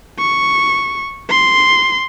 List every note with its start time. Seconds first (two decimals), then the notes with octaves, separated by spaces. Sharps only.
0.19 C#6
1.30 C6